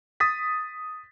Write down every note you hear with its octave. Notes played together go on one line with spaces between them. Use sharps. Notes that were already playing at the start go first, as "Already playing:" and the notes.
D#6 A6 B6